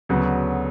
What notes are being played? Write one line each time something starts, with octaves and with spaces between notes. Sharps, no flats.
D2 C#3 F#3 B3